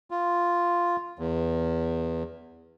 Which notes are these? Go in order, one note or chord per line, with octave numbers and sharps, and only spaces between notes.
F4
E2